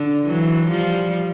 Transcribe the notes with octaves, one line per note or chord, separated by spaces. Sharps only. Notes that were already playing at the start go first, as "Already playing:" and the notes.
Already playing: D3
E3 F#3
F3 G3